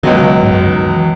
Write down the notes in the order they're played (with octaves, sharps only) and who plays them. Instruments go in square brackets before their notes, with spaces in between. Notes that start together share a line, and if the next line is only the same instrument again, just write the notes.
[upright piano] C#2 B2 F#3 [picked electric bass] D#3
[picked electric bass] C#3
G#2
F#2
D#3
E3